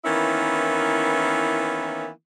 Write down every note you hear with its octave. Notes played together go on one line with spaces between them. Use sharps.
D#3 E3 A#3 B3 C#4 E4